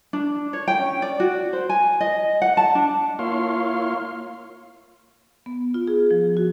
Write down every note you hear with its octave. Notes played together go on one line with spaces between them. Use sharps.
D4
C#5
G5
C#4
D5
F#4
C5
G#5
D#5
F#5
A5
D4
A#3 E4 F4 C#5 F5 C6
B3
F4
G#4
F3
F#4